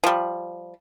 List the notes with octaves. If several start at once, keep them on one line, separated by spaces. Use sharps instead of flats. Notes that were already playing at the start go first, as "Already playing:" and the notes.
F3 G3